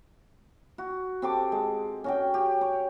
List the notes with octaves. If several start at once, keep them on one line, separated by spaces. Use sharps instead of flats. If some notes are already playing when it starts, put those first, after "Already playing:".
F#4
C4 G4 A4 D6
G#3
C#4 F#4 G5
G4
C#5